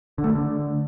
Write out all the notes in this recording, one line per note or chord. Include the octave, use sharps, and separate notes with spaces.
D3
A3
D3